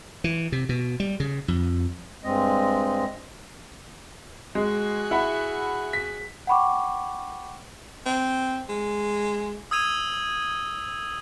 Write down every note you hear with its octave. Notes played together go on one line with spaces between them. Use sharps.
E3
C3
B2
G3
C#3
F2
G2 G#3 C4 D#5
G#3 F#4 G#4
E4 F#5 B5
B6
F#5 G5 B5 C#6 D6
C4
G#3
D#6 E6 G#6 D#7 F7